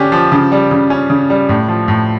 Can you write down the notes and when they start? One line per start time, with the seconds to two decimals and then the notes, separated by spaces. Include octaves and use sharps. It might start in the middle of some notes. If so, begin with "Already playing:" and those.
Already playing: D3 C#4 G4
0.12 F3
0.32 C#3
0.52 G3
0.71 C#3
0.90 C#4
1.10 C#3
1.30 G3
1.49 A2
1.68 F3
1.88 A2